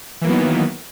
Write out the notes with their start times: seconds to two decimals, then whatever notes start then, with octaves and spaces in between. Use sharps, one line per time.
0.22 E3
0.24 A#3
0.27 F#3
0.29 B3
0.32 D#3